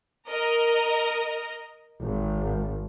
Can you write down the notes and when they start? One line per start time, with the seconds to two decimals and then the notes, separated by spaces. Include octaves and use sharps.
0.30 A#4 D#5
2.03 G#1